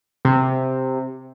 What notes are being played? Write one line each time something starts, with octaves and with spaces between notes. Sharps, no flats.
C3